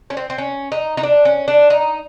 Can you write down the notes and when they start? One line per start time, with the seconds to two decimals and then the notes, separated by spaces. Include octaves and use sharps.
0.10 C#4
0.17 C4
0.30 C4
0.38 C#4
0.72 D#4
0.97 D#4
1.03 D4
1.25 C#4
1.48 D4
1.70 D#4